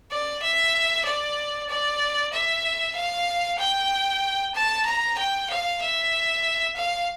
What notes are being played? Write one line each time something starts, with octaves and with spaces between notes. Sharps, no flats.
D5
E5
D5
D5
E5
F5
G5
A5
A#5
G5
F5
E5
F5